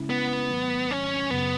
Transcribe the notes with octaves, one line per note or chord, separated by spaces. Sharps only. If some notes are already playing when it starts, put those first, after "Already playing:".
Already playing: C#3 G#3 C#4 E4
B3
G#2 D#3 F#3 A3
C#4
F#2 C#3 F#3 B3